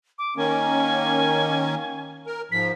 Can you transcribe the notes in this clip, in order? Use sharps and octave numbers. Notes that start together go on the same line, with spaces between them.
D6
D#3 A#3 C#4 G#5
A#4
G#2 F3 B6